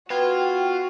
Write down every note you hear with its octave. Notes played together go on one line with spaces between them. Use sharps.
B3 F4 F#4 G5 G#6